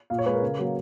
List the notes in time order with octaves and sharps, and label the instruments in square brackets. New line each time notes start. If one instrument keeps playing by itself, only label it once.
[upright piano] A#2 F5
C#5
G#3 B4
A#4
C#3
F#3 A#3